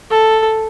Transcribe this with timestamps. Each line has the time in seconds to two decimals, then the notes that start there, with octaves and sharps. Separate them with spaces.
0.11 A4